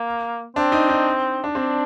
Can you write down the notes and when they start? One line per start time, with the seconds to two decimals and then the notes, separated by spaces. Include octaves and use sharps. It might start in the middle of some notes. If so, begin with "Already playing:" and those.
Already playing: A#3
0.56 C4 D4
0.72 D#4
0.89 D#4
1.44 D4
1.55 C4 D4